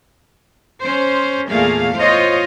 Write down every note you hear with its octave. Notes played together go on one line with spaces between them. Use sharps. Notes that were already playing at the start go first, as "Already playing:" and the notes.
C#4 C5
E2 A#2 A3 A#3 G#4 F5
A2 F4 C5 C#5 D#5